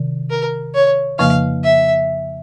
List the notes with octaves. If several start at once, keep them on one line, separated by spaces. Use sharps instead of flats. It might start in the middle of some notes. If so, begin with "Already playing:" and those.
Already playing: C3 D#3
A#4
C#5
F2 C#3 F3 A#3 F5
E5